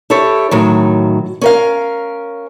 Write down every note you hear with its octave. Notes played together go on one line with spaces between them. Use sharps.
E4 G4 A4 C#5
A2 D#3 F#3
C#4 A#4 F5